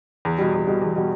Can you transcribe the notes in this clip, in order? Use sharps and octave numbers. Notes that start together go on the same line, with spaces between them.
E2
B2 G3
E2
B2 G3
E2
B2 G3